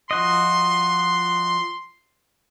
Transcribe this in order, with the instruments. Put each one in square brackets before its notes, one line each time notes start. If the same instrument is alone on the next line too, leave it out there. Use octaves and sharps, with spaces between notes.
[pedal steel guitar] F3 F#4 D#5 [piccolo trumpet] C6